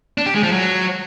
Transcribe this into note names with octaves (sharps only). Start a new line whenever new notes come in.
D4
G4
G#3
F3
F#3